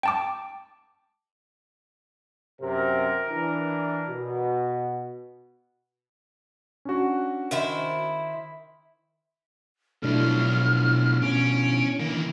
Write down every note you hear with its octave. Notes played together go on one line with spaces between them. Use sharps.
G5 A5 D6
F#2 C3 A#4
E3 D4
B2
C#4 D4 F#4
D#3 E4 C5
B1 B2 F3 A3 D4 E4 F6
C#4 D7
D#3 E3 A#3